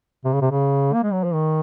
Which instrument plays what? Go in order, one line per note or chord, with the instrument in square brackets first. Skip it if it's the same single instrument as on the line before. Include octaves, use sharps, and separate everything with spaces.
[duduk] C3
C#3
C3
C#3
A#3
G#3
F#3
F3
D#3